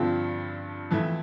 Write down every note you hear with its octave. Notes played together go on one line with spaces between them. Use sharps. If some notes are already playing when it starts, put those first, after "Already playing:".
Already playing: G2 D3 F3 C4 F4
F2 E3 A3 E4